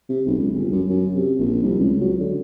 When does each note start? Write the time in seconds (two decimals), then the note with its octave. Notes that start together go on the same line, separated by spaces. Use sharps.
0.09 C3
0.26 B1
0.38 C#2
0.55 G1
0.72 F#2
0.90 F#2
1.15 C3
1.39 A#1
1.63 C2
1.79 C#2
2.00 F#3
2.20 D3